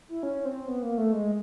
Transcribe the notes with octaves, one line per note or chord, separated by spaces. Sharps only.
E4
C#4
C4
B3
A#3
A3
G#3